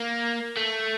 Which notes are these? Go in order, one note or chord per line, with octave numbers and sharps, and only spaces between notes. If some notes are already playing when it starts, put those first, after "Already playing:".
Already playing: A#3
A3